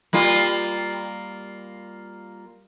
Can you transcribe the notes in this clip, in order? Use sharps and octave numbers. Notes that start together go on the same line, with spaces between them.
G3 A#3 F4